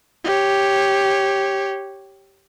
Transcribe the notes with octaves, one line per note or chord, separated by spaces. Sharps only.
G4 C#5